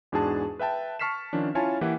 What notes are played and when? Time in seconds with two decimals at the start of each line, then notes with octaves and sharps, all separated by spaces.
0.12 E2 G#2 D4 F#4 G#4 A5
0.59 B4 E5 G5 A5
0.99 A5 C#6 F6 B6 C7 E7
1.33 D#3 F3 C#4 D4
1.55 C#4 E4 F4 C#5 G#5 A5
1.81 E3 A#3 E4 G4 B4 F#5